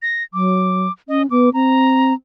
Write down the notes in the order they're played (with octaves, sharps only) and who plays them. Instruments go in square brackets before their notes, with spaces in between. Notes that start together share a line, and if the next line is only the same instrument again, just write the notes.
[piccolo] A#6
[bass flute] F#3 [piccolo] D6
[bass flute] C#4 [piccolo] D#5
[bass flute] B3 [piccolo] D6
[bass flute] C4 [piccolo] A#5